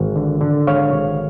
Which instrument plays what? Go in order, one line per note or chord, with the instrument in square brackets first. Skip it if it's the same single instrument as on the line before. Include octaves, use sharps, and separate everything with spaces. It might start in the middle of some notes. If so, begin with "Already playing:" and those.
Already playing: [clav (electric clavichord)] G#1
D3
D3
G#1 C#5 F5
G#1